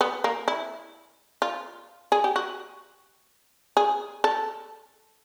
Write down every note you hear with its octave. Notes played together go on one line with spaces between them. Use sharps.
B3
A#3
E4
F4
G#4
G4
F#4
G#4
A4